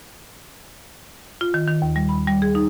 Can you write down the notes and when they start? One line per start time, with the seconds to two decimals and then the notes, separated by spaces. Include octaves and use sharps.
1.41 F4
1.54 D#3
1.68 D#3
1.82 D#2
1.96 G3
2.09 B5
2.27 G3
2.42 G#4
2.55 D#4